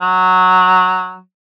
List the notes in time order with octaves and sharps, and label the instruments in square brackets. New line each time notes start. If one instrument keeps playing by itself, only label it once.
[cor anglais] F#3